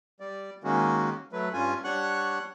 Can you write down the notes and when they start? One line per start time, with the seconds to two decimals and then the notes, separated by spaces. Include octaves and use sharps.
0.20 G3 D5
0.64 D#3 G#3 A#3 C#4 F#4
1.33 F#3 A3 B4
1.53 G2 C#4 F4 G#5
1.84 G3 D4 C#5 F#5 C#6 F#6